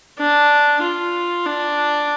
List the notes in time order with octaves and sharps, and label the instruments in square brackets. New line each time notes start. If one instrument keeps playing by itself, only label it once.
[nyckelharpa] D4
F4
D4